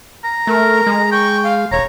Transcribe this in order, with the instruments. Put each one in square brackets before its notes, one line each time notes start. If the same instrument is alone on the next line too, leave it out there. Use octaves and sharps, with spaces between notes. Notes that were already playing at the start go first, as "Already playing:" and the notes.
[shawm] A#5
[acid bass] A3 [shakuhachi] A#4
[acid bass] G#3
[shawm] G5 [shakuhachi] C#6
[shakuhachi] F5
[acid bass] D#1 [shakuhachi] C#5 [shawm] A#5